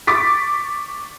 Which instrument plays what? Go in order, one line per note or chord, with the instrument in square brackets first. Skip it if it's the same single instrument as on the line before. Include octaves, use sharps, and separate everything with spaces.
[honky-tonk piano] C#6 D6 A6 B6